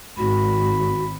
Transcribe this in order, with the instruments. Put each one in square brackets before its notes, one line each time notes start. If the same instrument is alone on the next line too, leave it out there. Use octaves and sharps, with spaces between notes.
[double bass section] G#1 [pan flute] F#4 [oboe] B5